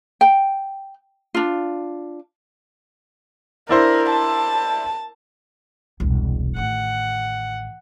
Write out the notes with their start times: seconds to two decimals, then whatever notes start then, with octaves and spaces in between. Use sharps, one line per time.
0.21 G5
1.35 D4 F4
3.69 D4 E4 A#4 C5
4.11 A5
6.00 E1 C2
6.56 A1 D#3 F#5